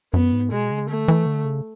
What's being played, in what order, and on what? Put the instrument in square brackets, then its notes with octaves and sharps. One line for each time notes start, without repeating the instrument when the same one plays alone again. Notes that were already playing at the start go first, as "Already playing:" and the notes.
[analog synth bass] F#2 [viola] B3
[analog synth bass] G#2
[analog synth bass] B2 [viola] G#3
[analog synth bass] C#3
[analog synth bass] D3 [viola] A3
[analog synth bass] E3
D3
C#3